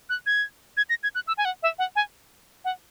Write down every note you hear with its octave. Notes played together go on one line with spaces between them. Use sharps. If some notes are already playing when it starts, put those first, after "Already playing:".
F#6
G#6
G#6
A#6
G#6
F#6
E6
G#5
F#5
E5
F#5
G#5
F#5